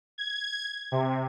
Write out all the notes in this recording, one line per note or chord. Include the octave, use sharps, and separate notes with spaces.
G#6
C3